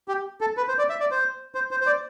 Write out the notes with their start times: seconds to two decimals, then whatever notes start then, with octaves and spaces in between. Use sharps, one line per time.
0.08 G4
0.41 A4
0.57 B4
0.68 C5
0.78 D5
0.90 E5
1.00 D5
1.11 C5
1.55 C5
1.71 C5
1.81 C5
1.87 D5